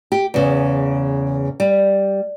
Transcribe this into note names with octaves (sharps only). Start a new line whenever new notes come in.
G4
E2 C#3
G3